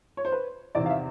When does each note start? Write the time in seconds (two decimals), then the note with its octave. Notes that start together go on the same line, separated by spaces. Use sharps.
0.17 C#5
0.25 C5
0.32 B4
0.75 E2 C3 D#3 D5
0.86 F5
0.90 E5